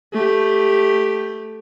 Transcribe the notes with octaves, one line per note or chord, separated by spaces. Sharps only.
A3 G4